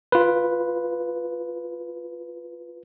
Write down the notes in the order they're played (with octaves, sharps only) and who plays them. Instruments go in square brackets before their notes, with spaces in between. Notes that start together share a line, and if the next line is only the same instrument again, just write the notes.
[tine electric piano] F4 B4